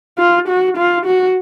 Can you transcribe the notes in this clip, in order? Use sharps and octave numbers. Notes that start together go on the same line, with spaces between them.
F4
F#4
F4
F#4